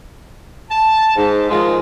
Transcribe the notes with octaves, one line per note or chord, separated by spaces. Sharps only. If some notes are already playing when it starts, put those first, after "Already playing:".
A5
G#2
G#2 D#3 F3 G#3